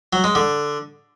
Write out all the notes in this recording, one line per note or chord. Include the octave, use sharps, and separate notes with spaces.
F#3
G#3
D3